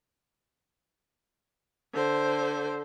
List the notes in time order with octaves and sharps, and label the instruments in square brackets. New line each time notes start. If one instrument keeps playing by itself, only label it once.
[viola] D3 C5